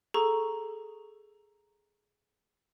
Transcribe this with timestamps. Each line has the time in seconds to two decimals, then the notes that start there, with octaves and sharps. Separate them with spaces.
0.14 G#4 A4 A#5 C#6